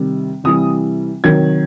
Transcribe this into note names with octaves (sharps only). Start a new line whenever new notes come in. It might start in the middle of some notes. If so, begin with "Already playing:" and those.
Already playing: C3 D#3 G3
C3 E3 G3 D#6
C3 D#3 F#3 G#6